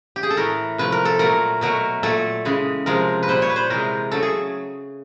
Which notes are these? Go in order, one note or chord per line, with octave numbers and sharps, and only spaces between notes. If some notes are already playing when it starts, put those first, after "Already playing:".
G4
G#4
A4
A2 E3 A3 A#4
C3 F3 A3 B4
A#4
A4
A#2 F#3 A3 A#4
B2 F#3 A3 A#4
A#2 F#3 A3 A4
C#3 E3 G#3
C3 F3 G#3 A#4
B4
A#2 G3 C5
C#5
B4
C5
C3 E3 G#3 A#4
C#3 F#3 A3 A4
G#4